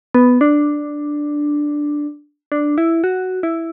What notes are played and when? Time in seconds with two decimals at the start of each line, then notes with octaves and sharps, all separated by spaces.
0.15 B3
0.41 D4
2.52 D4
2.78 E4
3.04 F#4
3.43 E4